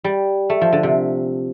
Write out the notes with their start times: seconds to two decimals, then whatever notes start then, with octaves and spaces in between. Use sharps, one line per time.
0.04 G3
0.50 A3
0.61 F3
0.72 D3
0.83 C3